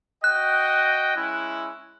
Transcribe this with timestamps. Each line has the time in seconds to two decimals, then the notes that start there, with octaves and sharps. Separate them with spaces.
0.24 F#4 D#5 G5 F#6
1.16 G#3 C#4 E4